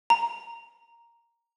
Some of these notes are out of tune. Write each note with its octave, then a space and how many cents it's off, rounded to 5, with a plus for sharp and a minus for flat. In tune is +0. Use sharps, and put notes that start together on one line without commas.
A#5 +0